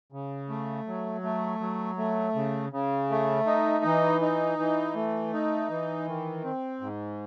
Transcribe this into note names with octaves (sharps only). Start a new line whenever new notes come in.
C#3
A3
F#3
A3
F#3
A3
C#3
C#3
A3
D#4
E3
D#4
E3
A3
D#4
E3
D#3
C4
G#2